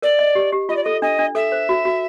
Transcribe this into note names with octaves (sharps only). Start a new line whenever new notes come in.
A#4 D5
D#5
G4
G4
F4 D#5
D5
A4 D#5
D4 D#5
D4
A4 E5
C5
F#4
F#4